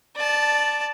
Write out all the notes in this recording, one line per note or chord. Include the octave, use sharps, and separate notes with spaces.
D5 A5